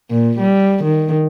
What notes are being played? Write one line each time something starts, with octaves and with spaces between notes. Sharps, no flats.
A#2
G3
D#3